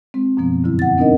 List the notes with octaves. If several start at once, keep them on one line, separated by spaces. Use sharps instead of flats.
G#3 C4
F#2 B2 F3 B3
F2 G#2 D3 F#3 B3 E4
F#5 A6
B3 C4 D4 D#4 A#4 D#5